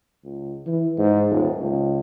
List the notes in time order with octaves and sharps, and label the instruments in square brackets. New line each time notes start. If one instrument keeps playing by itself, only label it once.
[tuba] C#2
E3
G#2
D#1
C#2